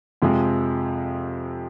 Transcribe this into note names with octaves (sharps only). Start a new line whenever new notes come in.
F2 C3 F3 G#3